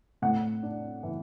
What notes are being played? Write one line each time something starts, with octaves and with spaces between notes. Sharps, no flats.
A2 F#5
D4
E3